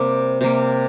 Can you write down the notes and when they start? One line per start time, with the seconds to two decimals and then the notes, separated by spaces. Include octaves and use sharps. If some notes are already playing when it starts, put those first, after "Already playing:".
Already playing: C3 G3 A#3
0.41 C3 G3 A#3